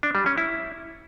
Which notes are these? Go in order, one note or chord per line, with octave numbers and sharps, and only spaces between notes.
D4
G3
C#4
E4